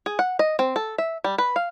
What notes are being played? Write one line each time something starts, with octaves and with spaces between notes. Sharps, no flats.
G#4
F#5
D#5
C4
A4
E5
G3
B4
F5